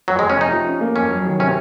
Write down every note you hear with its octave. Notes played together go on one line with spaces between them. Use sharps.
F2 F#3
G#3
F1
C#4
C3 D#4
F3
C#4
A#3
F2 C#4
F#3
D#3
C3 C#4